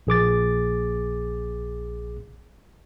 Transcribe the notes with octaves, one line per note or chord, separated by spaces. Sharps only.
A#1 G#4 D6 A6